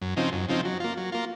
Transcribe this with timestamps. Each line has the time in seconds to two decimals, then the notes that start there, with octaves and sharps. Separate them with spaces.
0.02 F#2
0.17 C#3 F3 C4 D#4
0.33 F#2
0.48 C#3 F3 C4 D#4
0.65 F#3
0.80 A#3 F4
0.97 F#3
1.12 A#3 F4